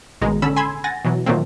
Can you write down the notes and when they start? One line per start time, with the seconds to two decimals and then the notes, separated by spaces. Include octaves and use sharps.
0.21 A1 B2 D#3 G#3 A#5
0.42 D3 C#4 A4 B5 E6
0.56 G#5 B5 C6 E6 G#6
0.84 F#5 G#5 A6 A#6
1.04 B2 E3 F#3
1.26 A#2 D#3 F#3 A3 A#3 C4